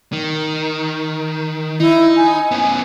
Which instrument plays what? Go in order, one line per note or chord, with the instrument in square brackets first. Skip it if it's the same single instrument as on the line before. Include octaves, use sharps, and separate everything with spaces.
[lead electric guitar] D#3
[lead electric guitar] D#4 [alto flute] E4
[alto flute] G#5
[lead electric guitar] B3 C#4